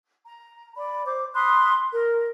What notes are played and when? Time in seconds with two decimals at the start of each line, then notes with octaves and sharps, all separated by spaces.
0.24 A#5
0.76 D5 B5
1.05 C5 D6
1.33 B5 C6 D#6 F#6
1.94 A#4